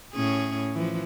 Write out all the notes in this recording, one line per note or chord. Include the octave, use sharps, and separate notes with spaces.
A2 C#4 G#4
E3 F3